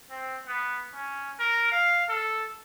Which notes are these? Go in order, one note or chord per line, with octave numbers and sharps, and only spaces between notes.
C4
B3
C#4
A#4
F5
A4